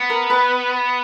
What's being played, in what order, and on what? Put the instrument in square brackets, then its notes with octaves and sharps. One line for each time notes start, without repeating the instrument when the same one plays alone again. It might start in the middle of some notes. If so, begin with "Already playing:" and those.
Already playing: [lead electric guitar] B3
[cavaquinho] A#4
B4